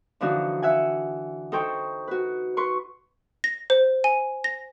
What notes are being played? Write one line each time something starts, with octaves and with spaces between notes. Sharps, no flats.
D3 E3 F3 D4 D#4 F#4
E5 F#5 G#5
D#4 A4 C5 G5 C#6
F#4 B4
B4 C6 C#6
A#6
C5
G#5
A#6